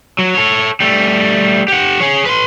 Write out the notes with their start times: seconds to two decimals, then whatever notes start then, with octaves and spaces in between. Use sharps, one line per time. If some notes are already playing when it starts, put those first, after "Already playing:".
0.19 F#3
0.35 A4 C#5
0.80 G3 A3
1.68 G4 F#5
2.00 G#4 C#5
2.25 B4 C6